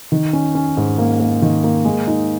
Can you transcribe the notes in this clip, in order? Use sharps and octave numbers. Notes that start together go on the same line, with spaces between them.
D#3
C#4
C#4
G#2
A#3
A#3
D#3
A#3
G#3
D#4